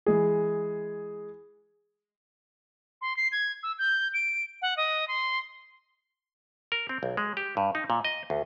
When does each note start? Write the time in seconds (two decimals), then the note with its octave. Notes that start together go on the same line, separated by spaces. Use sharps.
0.06 E3 G#3 G#4
3.01 C6
3.17 C7
3.32 G#6
3.63 E6
3.79 G6
4.14 D7
4.62 F#5
4.77 D#5
5.08 C6
6.72 A#4
6.89 C4
7.03 B1
7.17 G#3
7.37 G4
7.57 G2
7.75 D#4
7.90 A#2
8.05 D#5
8.30 D2